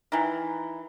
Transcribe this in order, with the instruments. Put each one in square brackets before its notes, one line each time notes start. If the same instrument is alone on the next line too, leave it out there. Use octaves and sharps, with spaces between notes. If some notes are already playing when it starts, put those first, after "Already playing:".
[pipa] D#3 E3